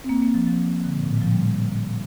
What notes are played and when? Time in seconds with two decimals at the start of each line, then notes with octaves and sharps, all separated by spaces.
0.04 C4
0.09 A#3
0.22 A#3
0.34 F3
0.47 F3
0.84 D3
0.94 A#2
1.03 A2
1.12 A#2
1.22 F3
1.31 G3
1.40 F3